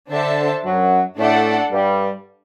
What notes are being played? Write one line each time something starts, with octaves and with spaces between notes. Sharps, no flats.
D3 D4 A4 C5 E5 A5
F#2 F#3
A2 A3 D4 A4 D5 F#5
G2 G3